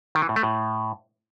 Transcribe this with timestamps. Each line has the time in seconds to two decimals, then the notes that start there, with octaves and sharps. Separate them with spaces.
0.15 D#3
0.22 E3
0.29 A2
0.36 A3
0.43 A2